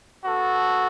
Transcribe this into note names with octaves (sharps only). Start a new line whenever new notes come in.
B3 F#4 A4